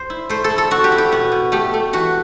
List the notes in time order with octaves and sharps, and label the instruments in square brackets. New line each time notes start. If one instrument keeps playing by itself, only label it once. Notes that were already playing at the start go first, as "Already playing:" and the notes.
Already playing: [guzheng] C5
E4
A3 C5
A4
E4
A4
C4 F#4
G4
E4
G4
B2 F#4
B2
A3 G4
A3
E3 F#4